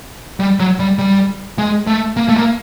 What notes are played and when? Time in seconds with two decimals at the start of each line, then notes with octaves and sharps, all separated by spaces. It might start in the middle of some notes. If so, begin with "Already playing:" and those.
0.40 G3
0.60 F#3
0.79 G3
0.99 G3
1.58 G#3
1.87 A3
2.17 A#3
2.29 A3
2.36 A#3